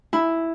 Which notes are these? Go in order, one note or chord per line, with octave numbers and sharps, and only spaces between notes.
E4